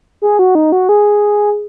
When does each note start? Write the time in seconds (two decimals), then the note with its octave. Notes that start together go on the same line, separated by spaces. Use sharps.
0.22 G#4
0.39 F#4
0.55 D#4
0.72 F#4
0.89 G#4